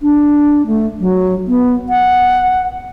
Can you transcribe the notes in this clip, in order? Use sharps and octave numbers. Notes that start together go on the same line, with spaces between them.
D4
A3
F#3
B3
F#5